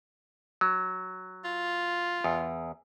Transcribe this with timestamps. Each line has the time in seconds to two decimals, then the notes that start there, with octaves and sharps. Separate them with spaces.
0.61 F#3
1.44 F4
2.24 E2